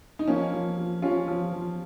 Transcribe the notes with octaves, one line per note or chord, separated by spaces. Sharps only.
D#4
F3 A#3 C#4
F3
F3
F3 C#4 F4
F3
F3